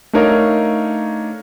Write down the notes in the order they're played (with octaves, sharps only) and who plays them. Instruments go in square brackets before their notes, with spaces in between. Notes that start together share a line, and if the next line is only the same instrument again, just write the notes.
[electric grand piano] A3 D4 D#4 A#4 C#5 F5